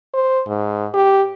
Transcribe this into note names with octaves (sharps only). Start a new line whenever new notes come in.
C5
G#2
G4